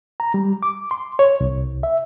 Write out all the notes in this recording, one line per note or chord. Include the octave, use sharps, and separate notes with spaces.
A#5
G3
D6
C6
C#5
C2
E5